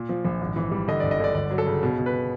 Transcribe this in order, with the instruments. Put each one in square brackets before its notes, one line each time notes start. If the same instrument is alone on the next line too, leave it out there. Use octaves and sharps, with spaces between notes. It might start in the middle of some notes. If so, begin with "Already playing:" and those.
Already playing: [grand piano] A#2
F3
A#1
G#1
E3
G3
D3 D#5
G1 D5
D#5
D3 D5
G1 D5
F#3
A4
C#3
B2
B2
B4